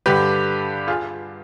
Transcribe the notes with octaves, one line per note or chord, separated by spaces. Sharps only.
G2 D3 G4 B4
F4 G#4